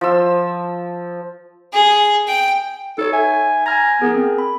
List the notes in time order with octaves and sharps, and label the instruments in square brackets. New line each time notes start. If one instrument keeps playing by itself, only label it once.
[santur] F3 E6
[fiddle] G#4
G5
[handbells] D#4 C#5 [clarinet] A4
[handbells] E5 [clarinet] G#5
[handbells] G#5 F6 G#6 [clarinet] A#5
[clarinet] B3 [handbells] G#4 A#4
[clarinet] C4
[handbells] B5